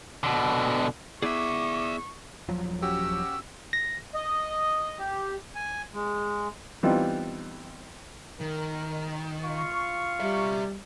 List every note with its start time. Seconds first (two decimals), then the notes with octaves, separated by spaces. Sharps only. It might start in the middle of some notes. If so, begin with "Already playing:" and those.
0.23 B2 D3
1.22 B3 E4 G#4 D5 E5 C#6 D6
2.48 D#1 F3 F#3
2.82 C#4 F#4 G4 E6
3.73 A#6
4.14 D#5
4.99 G4
5.55 G#5
5.94 G#3
6.83 E3 G3 B3 C4 D#4 F4
8.41 D#3 A#4
9.44 F4 F5 C#6
10.20 G3 G4 E5